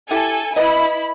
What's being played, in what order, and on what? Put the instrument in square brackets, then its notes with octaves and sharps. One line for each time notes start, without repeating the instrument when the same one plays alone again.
[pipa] E4 G4 [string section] A4 G#5
[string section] E4 B5 [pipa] B4 D#5